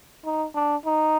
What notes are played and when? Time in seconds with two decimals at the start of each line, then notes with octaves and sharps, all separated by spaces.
0.25 D#4
0.55 D4
0.86 D#4